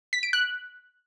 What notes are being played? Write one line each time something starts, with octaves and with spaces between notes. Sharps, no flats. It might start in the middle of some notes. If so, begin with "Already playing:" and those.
B6
D7
F#6